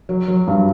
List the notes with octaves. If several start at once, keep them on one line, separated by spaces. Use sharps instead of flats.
F#3
F#3
G2